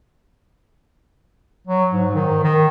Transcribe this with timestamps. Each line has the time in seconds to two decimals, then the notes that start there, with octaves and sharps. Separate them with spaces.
1.67 F#3
1.92 G#2
2.15 D#3
2.44 D#3